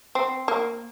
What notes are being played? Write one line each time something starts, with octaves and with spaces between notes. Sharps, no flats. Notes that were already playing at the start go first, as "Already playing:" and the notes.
C4
A#3